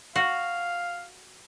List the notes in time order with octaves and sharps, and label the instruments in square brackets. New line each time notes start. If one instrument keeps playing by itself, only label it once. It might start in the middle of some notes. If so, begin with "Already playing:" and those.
[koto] F#4 [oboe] F5